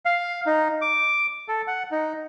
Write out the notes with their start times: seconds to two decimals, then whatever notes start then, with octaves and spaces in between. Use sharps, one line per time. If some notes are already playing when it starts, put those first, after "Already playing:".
0.06 F5
0.46 D#4
0.82 D6
1.49 A4
1.67 F#5
1.91 D#4